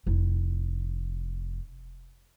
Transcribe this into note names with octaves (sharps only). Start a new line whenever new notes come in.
F1 E4